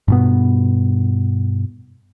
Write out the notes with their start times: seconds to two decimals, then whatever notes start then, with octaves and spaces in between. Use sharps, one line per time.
0.08 G2 B2 B3